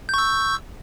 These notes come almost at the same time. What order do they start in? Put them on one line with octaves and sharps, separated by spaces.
G6 C#6 E6